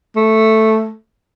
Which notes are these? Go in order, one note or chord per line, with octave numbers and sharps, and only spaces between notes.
A3